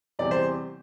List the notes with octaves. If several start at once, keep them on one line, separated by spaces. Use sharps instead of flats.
E2 C3 E3 G3 D5
C5